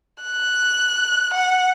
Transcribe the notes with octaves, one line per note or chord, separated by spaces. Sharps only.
F#6
F#5